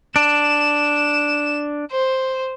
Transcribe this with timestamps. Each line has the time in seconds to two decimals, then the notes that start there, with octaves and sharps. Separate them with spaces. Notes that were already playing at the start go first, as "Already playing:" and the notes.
0.16 D4 E7
1.91 C5